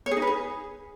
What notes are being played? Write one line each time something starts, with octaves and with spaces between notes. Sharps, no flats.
C#5
G#4
D#4
B4
G#4